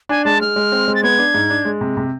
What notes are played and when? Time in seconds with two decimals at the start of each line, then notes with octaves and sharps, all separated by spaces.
0.09 D4 G#5
0.25 G#3 A5
0.41 G#3 F6
0.56 G#3
0.72 C4
0.88 G#3
0.95 A6
1.03 B3 G#6
1.18 D4
1.34 G#2
1.50 D4
1.65 G#3
1.81 C3
1.97 C3